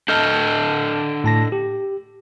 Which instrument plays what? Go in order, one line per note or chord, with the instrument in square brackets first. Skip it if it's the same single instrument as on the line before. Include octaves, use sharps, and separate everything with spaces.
[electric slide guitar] D4 A4 D#5 [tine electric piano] A5 F6 G6
[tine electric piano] A2 A5 A#6
G4